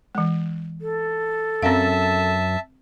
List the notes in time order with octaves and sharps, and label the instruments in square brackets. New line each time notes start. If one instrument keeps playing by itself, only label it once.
[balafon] E3 G#3
[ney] A4
[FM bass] F#2 [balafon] C4 F5 [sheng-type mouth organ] E5 A5